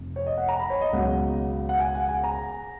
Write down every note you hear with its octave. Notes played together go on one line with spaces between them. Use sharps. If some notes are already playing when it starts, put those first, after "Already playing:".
Already playing: F1 F2
C#5
D#5
F#5
A#5
B5
C#5
D#5
C#2 B2 F#3 F#5
F#5
G#5
F#5
G#5
A#5